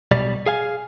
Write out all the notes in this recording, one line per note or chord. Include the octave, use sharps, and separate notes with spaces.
B1 B2 G3 D5
G#4 F5 G#5